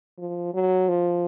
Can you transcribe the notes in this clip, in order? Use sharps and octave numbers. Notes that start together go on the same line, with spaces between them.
F3
F#3
F3